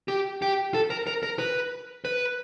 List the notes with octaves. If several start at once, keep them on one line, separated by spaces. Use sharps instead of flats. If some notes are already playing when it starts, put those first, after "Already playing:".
G4
G4
A4
A#4
A#4
A#4
B4
B4